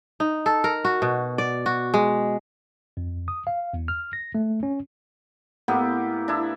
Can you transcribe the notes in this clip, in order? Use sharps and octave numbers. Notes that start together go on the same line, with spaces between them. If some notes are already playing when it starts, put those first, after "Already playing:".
D#4
A4
A#4
F#4
B2
D5
F#4
G#3
F2
D#6
F5
E2
F6
A#6
A3
C#4
A2 A#3 B3 G4
D4 E4